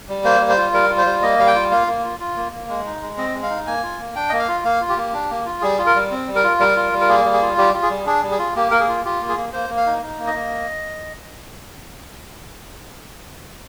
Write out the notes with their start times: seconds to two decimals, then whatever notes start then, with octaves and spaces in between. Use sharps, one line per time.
0.09 G3
0.25 A#3 C5
0.40 G3
0.49 C5
0.57 F4
0.73 G3 A#4
0.89 F4
0.98 C5
1.06 G3
1.22 A#3 D#5
1.39 G3 F5
1.47 G5
1.55 F4
1.71 A#3 F5
1.87 A#3
2.04 F4
2.20 F4
2.37 A#3
2.52 A#3
2.69 G#3
2.85 D#4
3.02 G#3
3.17 C4 D#5
3.35 G#3
3.43 F5
3.50 D#4
3.67 A#3 G#5
3.83 F4
3.99 A#3
4.15 D4 G5
4.29 A#3 D#5
4.39 F5
4.48 F4
4.64 A#3 F5
4.81 F4
4.89 G4
4.97 A#3
5.13 D4
5.30 A#3
5.46 F4
5.62 G3 G#4
5.79 F4
5.87 A#4
5.95 G3
6.11 C4
6.27 G3
6.36 A#4
6.44 F4
6.60 G3 A#4
6.76 F4
6.92 G3
7.01 A#4
7.09 A#3 G#4
7.25 G3
7.33 G#4
7.42 F4
7.58 G3 G4
7.74 F4
7.83 G#4
7.90 G3
8.06 D4 G#4
8.23 G3
8.31 G#4
8.39 F4
8.56 A#3 G4
8.71 A#3 A#4
8.80 G#4
8.89 F4
9.05 F4 G4
9.21 A#3
9.29 G#4
9.37 A#3
9.53 A#3 C5
9.69 A#3
9.77 F5
9.86 D#4
10.03 D#4
10.19 A#3
10.27 D#5
10.34 A#3